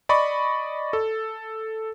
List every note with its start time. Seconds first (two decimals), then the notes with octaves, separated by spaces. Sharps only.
0.09 D5 D#5 B5 C#6
0.93 A4